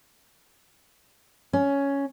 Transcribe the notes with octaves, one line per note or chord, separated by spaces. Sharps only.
C#4